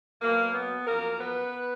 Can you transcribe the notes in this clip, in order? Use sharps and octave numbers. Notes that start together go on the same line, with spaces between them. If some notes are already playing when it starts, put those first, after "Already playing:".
B2 F#3 A#3
B3
F#2 F3 A#3 A#4
B3 B4